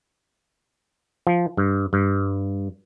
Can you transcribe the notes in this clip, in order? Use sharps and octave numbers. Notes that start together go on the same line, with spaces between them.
F3
G2
G2